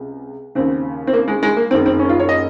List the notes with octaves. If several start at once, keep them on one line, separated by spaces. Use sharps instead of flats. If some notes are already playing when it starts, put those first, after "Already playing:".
Already playing: C#2 C3
D#2 C#3 C4
C4
A#3
G#3
G#3
A#3
F#1 F#2 D#3 C4
C4
C#4
F4
C#5
D#5